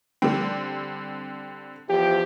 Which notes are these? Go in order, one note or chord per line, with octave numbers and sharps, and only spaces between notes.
D3 G3 C4
E2 F3 G4